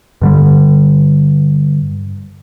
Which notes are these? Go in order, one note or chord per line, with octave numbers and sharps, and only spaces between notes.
G2 D3 G3